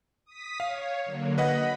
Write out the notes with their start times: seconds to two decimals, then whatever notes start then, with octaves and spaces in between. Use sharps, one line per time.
0.25 D#6 B6
0.60 C#5 F5
1.05 D3 F#3 A#3
1.38 B4 D#5 F#5 B5